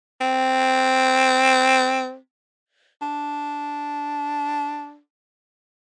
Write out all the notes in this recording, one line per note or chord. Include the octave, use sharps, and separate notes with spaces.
C4
D4